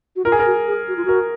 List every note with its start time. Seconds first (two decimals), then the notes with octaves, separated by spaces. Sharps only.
0.16 F#4
0.25 F4 A#4
0.32 G#4
0.39 A#4
0.46 F#4
0.67 G#4
0.88 F#4
0.97 F4
1.05 F#4 A#4